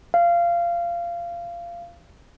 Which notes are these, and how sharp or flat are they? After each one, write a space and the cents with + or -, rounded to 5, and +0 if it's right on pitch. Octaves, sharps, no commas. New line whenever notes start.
F5 -20